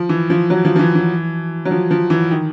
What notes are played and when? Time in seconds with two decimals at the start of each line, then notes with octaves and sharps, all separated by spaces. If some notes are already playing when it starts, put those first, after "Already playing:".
Already playing: F3
0.09 E3
0.30 F3
0.50 F#3
0.65 F3
0.76 F3
0.79 E3
0.95 E3
1.65 F#3
1.71 F3
1.91 F3
2.10 E3
2.31 D#3